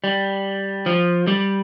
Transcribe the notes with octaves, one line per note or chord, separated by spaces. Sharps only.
G3
F3
G3